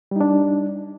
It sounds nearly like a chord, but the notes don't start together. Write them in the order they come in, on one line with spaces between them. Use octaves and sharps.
G3 D#4 D4